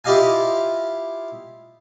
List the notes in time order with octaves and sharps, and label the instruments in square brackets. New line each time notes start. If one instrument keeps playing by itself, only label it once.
[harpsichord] E4 F4 G4 D#5 F5 G#5